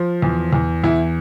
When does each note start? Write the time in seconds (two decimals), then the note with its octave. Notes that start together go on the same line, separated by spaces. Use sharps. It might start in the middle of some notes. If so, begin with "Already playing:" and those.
Already playing: F3
0.22 E2
0.53 E2
0.84 E2 E4